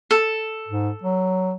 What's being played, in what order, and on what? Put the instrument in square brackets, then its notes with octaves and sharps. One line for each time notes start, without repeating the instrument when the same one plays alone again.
[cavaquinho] A4
[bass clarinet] G#2
F#3